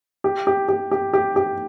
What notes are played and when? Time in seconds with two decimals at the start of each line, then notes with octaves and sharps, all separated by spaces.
0.24 G4
0.47 G4
0.68 G4
0.91 G4
1.13 G4
1.36 G4